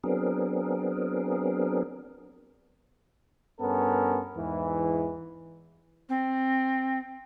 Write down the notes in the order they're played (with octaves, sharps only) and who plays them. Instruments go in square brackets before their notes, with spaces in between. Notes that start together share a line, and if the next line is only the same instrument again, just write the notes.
[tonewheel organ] F#3 B3 C4 D4 G#4 A#4
[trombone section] G2 B3 C#4 A4 A#4
E2 G#2 E3
[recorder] C4